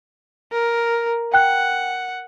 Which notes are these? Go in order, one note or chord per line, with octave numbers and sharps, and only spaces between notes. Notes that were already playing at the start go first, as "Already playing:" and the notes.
A#4
F#5 G5 F#6